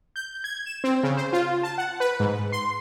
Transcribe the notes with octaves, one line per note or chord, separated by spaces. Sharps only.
G6
G#6
E7
C4
C#3
C5
F4
A5
F#5
B4
G#2
C6